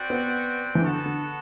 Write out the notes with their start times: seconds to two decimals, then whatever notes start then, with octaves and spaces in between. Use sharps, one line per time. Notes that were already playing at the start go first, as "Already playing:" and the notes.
Already playing: C4 F#4 B4 D5 G5
0.10 B3
0.75 E3
0.81 D3 B3 F#4 A4
1.05 D3